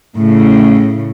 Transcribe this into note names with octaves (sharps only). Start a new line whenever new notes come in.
A2 C#3